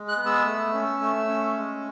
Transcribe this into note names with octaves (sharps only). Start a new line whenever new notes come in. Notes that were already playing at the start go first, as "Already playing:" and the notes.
Already playing: G#3
F#6
B3
E6
A3
C#4
A3
C#4
G#3